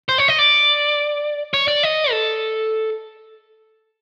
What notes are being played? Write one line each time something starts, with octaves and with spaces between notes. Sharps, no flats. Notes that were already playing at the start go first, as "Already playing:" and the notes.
C5
C#5
D#5
D5
C#5
D5
D#5
A4